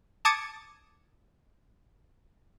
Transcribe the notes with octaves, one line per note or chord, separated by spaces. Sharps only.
A5 D6 D#6 G#6 A6 C#7